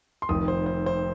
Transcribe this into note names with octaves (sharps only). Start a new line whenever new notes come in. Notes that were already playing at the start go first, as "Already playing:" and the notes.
C6
F1 F2 D#3 D#6
C5
C5
C5